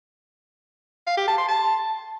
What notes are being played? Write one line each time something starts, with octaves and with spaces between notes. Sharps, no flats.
F5
G4
A5
C6
A5